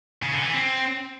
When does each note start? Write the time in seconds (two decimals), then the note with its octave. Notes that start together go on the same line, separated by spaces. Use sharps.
0.23 C#3
0.33 D3
0.44 E3
0.54 C4